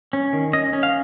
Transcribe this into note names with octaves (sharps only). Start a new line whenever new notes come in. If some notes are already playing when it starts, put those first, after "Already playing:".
C#4
D#3
C#4 D#5
C#4
F5